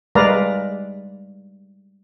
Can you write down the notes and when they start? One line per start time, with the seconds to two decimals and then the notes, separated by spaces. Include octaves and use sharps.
0.15 G3 G#3 B4 D5 F5 A#5